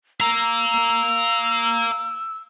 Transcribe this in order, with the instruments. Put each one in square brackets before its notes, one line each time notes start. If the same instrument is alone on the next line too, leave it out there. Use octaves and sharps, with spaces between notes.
[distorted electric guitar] F5 A#5 [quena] E6